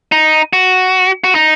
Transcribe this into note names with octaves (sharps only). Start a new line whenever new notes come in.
D#4
F#4
F#4
D#4